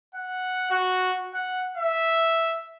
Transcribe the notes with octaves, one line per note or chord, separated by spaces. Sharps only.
F#5
F#4
F#5
E5